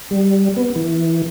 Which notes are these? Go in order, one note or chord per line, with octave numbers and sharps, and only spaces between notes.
G3
B3
E3